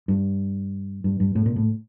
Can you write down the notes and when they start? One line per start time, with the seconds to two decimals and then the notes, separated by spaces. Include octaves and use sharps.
0.08 G2
1.04 G2
1.20 G2
1.35 A2
1.46 A#2
1.56 A2